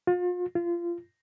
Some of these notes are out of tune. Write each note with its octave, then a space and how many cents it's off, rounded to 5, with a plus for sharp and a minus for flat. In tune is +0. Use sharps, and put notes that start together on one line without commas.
F4 +35
F4 -25